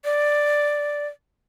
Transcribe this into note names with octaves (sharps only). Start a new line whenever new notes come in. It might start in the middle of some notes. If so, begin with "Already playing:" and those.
D5